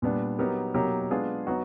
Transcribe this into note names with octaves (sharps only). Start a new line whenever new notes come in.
A#2 G3 B3 D4
F#3 B3 D#4 G4 A#4
B2 F#3 A#3 D#4 G4
G#3 B3 D4 F4 G#4
F#3 B3 D#4 F#4